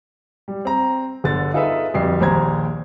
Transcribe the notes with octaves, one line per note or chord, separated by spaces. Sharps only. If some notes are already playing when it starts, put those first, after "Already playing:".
G3
C4 A#5
G1 D3 A6
D#4 F4 G#4 A4 B4 E5
D1 F2 G3 C7
A#1 D#2 C5 A#5 G#6